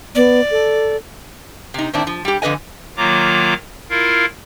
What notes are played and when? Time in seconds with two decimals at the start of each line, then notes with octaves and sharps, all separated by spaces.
0.15 B3 D5
0.51 A4
1.74 C3 D#4
1.93 A2 D#3 C4 D4 E4
2.07 F3
2.25 G3 G4
2.42 F2 D3 B4 D#5 G#5
2.97 D#3 F#3 A#3 F4 A#5 D6
3.90 E4 F4 A#4 F5